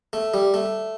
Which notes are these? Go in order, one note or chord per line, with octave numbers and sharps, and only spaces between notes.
A3
G3
A3